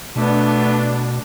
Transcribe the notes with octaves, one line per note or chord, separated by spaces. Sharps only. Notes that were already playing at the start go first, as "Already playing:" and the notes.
B2 A3 B3 D4